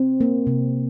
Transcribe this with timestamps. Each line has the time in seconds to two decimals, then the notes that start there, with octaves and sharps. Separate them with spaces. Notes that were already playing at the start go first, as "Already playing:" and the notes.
Already playing: C4
0.21 A#3
0.47 C3